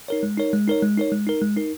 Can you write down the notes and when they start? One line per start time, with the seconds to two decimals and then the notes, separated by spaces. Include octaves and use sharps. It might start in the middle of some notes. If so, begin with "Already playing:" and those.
0.08 D#4 A#4 C#5
0.23 G#3
0.38 D#4 A#4 C#5
0.53 G#3
0.68 D#4 A#4 C#5
0.82 G#3
0.97 D#4 A#4 C#5
1.12 G#3
1.27 D#4 A#4
1.42 G#3
1.57 D#4 A#4